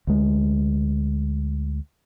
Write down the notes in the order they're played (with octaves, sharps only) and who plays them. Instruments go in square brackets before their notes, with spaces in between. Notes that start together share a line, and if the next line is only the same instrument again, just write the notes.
[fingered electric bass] D2 G#3